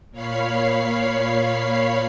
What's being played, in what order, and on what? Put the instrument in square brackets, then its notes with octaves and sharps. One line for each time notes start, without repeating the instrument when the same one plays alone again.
[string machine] A#2 C#5 F5 B5 C7